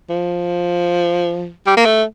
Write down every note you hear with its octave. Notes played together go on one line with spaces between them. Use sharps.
F3
G3
A#3
A3